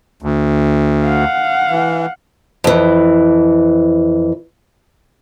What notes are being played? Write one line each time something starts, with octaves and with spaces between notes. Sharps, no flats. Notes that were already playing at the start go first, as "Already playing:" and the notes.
D2
F5 F#5
E3
F2 E3